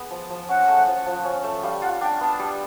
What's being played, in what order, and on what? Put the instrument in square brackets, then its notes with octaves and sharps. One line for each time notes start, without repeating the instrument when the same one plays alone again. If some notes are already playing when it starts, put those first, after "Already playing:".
Already playing: [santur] B3 G#4
F3
F3
[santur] C#4 [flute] F#5
[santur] A3
F3
F3
C#4
A3
[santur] G3 [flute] F5
[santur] F4 [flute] F#5
[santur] D4 [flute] G5
[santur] B3 [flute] A5
[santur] G3